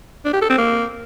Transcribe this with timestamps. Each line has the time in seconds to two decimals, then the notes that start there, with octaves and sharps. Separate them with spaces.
0.25 D4
0.33 G4
0.41 A4
0.50 C4
0.58 A#3